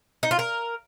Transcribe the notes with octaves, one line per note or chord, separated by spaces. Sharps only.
D#4
F4
A#4